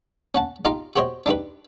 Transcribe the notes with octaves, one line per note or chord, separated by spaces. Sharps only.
C#4 F#5 A5
D#4 F4 G4 D#5 F5 A#5
F#4 G4 C5 C#5 D#5
D4 D#4 G4 B4